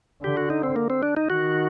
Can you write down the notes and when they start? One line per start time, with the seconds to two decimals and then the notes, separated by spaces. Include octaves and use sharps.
0.24 D3 G4
0.37 F#4
0.50 D#4
0.63 C4
0.76 A#3
0.90 C4
1.03 D4
1.17 D#4
1.29 D#3 F#4